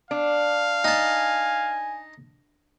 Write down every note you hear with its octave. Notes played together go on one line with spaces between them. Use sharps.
D4 F5
D#4 G#5 A5